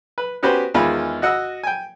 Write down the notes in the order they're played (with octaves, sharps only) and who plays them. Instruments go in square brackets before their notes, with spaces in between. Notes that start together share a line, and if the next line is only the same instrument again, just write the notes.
[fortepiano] B4
B3 C#4 F#4 G4 B4 C5
E2 D#3 G#3 F4 B5 F6
F#4 D#5 F#5 E6
G5 G#5